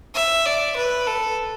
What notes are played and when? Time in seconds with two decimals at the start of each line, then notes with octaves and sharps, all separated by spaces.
0.15 E5
0.46 D5
0.77 B4
1.07 A4